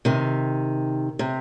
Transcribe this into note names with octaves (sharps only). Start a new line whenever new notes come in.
C3 D#3
C3